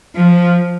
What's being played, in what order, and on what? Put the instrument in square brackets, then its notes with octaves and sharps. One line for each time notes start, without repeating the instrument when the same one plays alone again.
[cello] F3